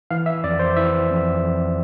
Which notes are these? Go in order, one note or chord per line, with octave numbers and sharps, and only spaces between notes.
E3 F5
E5
F2 D5
C5
E3 E5
F2
F2